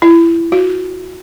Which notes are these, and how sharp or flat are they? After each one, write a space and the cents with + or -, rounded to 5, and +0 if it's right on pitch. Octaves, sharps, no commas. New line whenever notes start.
E4 +25
F#4 -10